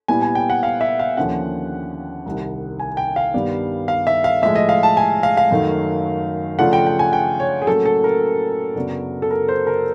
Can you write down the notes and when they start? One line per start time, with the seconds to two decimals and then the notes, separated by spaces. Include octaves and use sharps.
0.08 A#2 G3 B3 E4 G#5
0.22 G#5
0.35 G5
0.50 F#5
0.63 F5
0.81 E5
0.99 F5
1.17 D#2 D3 F3 A#3 C#4 F#5
2.26 C2 C3 D#3
2.80 G#5
2.97 G5
3.16 F5
3.34 G2 D#3 G3 B3 D4
3.88 F5
4.07 E5
4.24 F5
4.42 A2 F3 G#3 E5
4.56 D#5
4.69 F5
4.83 A5
4.97 G#5
5.23 F5
5.37 F5
5.51 F#2 D#3 F#3 A3
6.59 C#3 F3 A3 D4 F4 F#5
6.73 G5
6.87 G5
6.99 G#5
7.13 G5
7.40 C#5
7.62 G#4
7.67 A2 F#3 A#3 C#4 A4
7.85 A4
8.04 A#4
8.75 F#2 C#3 F#3 B3 D4
9.22 A4
9.31 A#4
9.49 C5
9.67 A#4